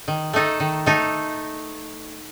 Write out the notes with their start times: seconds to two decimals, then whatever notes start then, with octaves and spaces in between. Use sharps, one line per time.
0.08 D#3
0.33 A3 D#4 A4
0.60 D#3
0.86 A3 D#4 A4